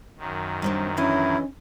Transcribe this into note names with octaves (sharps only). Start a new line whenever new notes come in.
F#2 D#3
G3 C4 D4
D3 E3 C#4 E4 D#5